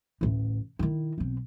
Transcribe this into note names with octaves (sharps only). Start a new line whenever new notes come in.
A1 D2
D#3 E4
B1 C4